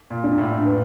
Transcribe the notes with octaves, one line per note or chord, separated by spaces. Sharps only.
A#2
D4
A2
B4